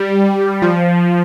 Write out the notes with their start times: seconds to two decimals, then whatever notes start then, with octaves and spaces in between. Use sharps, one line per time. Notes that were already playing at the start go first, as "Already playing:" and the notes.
Already playing: G3
0.62 F3